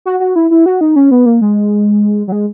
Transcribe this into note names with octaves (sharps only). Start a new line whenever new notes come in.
F#4
F#4
E4
E4
F#4
D#4
C#4
B3
A#3
G#3
F#3
G#3